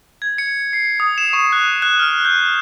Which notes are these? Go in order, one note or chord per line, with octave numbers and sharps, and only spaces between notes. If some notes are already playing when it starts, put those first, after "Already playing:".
G#6
C#7
C7
D#6
E7
C#6
F#6
F#6
F6
G6